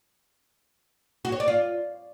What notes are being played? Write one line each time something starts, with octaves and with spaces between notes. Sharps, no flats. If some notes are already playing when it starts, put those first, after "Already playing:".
F#4
C#5
D5
F4